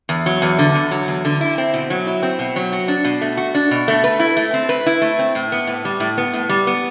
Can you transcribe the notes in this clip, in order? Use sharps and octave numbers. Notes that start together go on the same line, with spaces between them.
E2
F#3
E2
D3
E2
F#3
E2
D3
E4
C4
B2
F#3
E4
C4
B2
F#3
F#4
D4
B2
A3
F#4
D4
B2
A3
B4
E4
A3
C4
B4
E4
A3
C4
A2
B3
A2
G3
A2
B3
A2
G3
B3